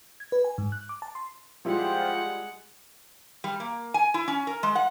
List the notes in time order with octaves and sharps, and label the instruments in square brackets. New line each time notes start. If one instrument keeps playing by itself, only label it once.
[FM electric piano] G#6
B4
G#5
G#2
F#6
D6
A5
C6
[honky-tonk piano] F3 G3 E4 [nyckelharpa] G#3 F#5 [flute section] F4 G4 C5
[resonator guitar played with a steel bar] G3
A#3
G#5
E4
C#4
A#4
G#3
F#5